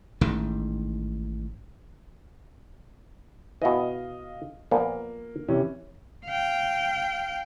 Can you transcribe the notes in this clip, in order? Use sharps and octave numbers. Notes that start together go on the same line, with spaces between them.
A1 G#2 D#3
B2 E3 D#5 F5 D#6
A#2 F3 A#3 B3
C3 E3 C#4
F5 G5